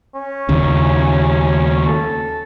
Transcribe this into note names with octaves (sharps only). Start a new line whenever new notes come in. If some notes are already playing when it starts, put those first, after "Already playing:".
C#4
D#2 C#3
A4